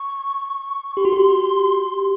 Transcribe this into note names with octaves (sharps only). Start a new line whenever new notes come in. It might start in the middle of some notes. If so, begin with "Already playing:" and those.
Already playing: C#6
G4 C6
F#4
G4